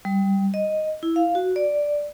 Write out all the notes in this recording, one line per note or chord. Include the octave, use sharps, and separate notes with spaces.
G3
D#5
E4
F5
F#4
D5